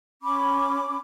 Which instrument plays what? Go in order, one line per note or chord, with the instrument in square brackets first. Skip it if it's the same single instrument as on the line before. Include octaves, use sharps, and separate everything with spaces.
[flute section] C#4 B5 D6